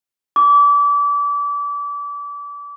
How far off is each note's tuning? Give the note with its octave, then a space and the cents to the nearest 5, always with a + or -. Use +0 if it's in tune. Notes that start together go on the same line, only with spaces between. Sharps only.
D6 -30